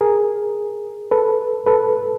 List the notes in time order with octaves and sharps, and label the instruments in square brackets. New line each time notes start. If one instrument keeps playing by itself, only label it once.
[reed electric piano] G#4 A#4
A4 B4
A4 B4